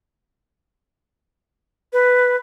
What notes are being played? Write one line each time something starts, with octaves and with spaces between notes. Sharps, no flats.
B4